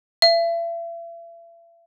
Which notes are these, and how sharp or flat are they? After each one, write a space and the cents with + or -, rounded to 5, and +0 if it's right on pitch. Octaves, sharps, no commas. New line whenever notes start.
E5 +40